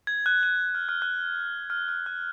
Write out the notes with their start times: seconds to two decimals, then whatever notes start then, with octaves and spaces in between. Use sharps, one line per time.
0.07 G#6
0.26 F#6
0.43 F#6
0.75 F6
0.89 F6
1.02 F#6
1.70 F6
1.88 F6
2.06 F#6